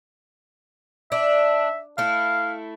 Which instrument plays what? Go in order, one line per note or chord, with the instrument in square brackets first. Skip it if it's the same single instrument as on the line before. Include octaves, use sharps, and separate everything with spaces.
[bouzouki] D4 [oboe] E5
[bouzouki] A3 E4 [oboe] F5